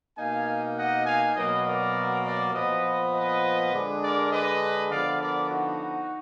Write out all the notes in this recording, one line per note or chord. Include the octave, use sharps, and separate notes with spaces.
B2 A#3 D#4 F5 G#5
D#5 F#5
F5 G#5
B2 F#3 A#3 B4 D#5
A#4 D5
A#4 D5
A#2 F3 B3 B4 D#5
B4 D#5
D3 G#3 D4
A#4 D5
B4 D#5
D3 F3 B3 D5 F5
A#4 D5
D#4 F#4